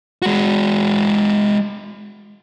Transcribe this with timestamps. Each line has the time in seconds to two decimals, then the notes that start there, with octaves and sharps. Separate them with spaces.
0.22 G#3 F#4